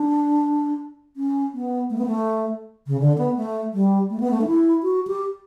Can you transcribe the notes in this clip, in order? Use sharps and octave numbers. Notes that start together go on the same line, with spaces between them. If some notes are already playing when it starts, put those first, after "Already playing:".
Already playing: D4
C#4
B3
A3
B3
A3
C#3
D3
B3
A3
G3
A3
B3
A3
D4
E4
F#4
G4